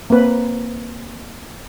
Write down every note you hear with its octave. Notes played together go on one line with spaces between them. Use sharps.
A#3 C4 B4